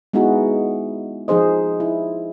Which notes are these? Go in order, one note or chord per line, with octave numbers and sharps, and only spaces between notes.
G#3 B3 D#4 E4 F#4 G#4
F3 D#4 G#4 C5 D#5
E4